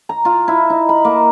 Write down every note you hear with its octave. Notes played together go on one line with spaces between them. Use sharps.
A#5
F4
E4
D#4
B5
A#3